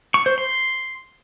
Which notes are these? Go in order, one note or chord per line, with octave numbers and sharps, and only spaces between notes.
C#6
C5
C6